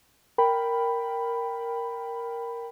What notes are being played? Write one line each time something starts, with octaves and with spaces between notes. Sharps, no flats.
A#4 G5 B5